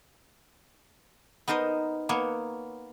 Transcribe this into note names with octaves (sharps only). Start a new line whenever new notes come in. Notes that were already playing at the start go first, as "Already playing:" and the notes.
B3 D#4 A#4 C5 D#5
A#3 B3 C#5